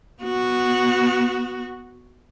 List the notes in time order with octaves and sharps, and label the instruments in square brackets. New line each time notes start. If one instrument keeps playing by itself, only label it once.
[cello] B3 F#4